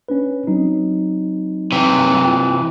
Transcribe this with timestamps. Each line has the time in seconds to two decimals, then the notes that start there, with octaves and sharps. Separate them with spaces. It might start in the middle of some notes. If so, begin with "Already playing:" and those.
0.09 C#4 D4 B4
0.47 F#3 C4 D#4
1.72 C3 E3
2.24 F4 G5